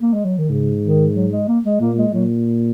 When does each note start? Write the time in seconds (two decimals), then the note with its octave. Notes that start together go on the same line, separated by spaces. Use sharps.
0.01 A#3
0.13 G#3
0.25 F#3
0.38 D#3
0.50 G#2 C#3
0.83 D#3
1.16 F#3
1.32 G#3
1.48 A#3
1.65 G#3
1.81 A#2 A#3
1.98 G#3
2.14 A#2 F#3